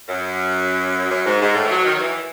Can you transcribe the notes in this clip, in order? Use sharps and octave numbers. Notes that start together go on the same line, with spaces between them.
F#2
F#2
G#2
G#2
A2
E3
F#3
D#3
F#3
E3